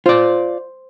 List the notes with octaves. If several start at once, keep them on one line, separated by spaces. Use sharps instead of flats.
F4 C5 D5